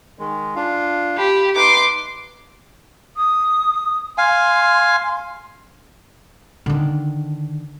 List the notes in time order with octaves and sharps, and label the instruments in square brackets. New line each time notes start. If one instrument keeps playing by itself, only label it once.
[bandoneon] D#3 G#3
D4 F4 F5
[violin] G4 [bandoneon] B5
[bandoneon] D#4 B4 [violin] C6 D6
[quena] D#6
[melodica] F5 G#5 [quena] C6
[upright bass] D3 D#3